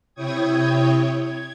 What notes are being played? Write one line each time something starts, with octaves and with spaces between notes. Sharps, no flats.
C3 E4 C#5 G5 D#6 G#6
G#6